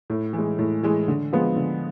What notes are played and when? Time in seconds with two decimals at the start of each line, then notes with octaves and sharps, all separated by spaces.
0.10 A2
0.33 E3
0.38 G#3
0.59 A2
0.83 E3 G#3
1.08 D3
1.33 F3 G#3 B3
1.56 D3